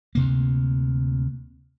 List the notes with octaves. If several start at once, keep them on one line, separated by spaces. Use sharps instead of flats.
D2 C3 A#3